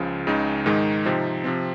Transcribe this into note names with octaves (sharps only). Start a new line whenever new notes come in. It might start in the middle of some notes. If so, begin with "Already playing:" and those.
Already playing: C#2 C#3 F3
C#2 C#3 G#3 D#4
G#2 D#3 G#3 D#4
C3 F3 C4 D#4
C3 F3 C4